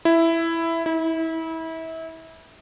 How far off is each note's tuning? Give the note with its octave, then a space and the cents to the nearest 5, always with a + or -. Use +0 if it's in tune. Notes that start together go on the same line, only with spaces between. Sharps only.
E4 +5
E4 -30